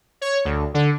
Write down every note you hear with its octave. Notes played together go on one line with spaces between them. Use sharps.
C#5
D2
D3